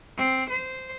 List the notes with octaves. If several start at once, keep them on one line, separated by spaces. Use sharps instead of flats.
C4
C5